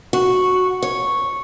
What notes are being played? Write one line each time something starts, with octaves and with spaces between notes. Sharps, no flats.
F#4
C#5